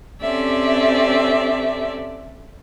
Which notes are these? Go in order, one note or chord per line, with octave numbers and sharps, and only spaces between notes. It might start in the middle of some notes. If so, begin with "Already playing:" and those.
C4 C#4 G4 A4 D5 E5